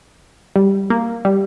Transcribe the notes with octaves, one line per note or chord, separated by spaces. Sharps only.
G3
A#3
G3